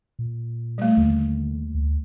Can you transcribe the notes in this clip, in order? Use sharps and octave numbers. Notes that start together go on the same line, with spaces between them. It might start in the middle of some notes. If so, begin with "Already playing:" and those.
A#2
G3 A3
D#2 D3
D2